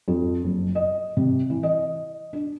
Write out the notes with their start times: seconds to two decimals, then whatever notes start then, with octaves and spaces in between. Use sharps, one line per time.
0.08 F2
0.44 F#1
0.75 D#5
1.17 C3
1.50 E3
1.63 D#5
2.33 D4